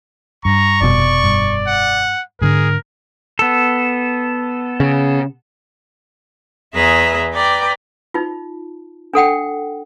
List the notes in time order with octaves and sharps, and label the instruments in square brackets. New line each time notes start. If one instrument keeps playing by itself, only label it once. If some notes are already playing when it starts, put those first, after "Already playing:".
[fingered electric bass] G2 [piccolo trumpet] A#5 [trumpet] C#6
[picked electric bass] F1 B2 [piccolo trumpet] D5
[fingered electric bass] G2
[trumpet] F#5
[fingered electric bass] G#2 D3 [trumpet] G#4 [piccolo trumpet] A#4
[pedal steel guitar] B3 A4
[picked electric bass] C#3
[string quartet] E2 G#4 B4 D#5 E5 A#5
B4 D5 G5 A#5
[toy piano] D#4 F4
D4 A4 F#5 G5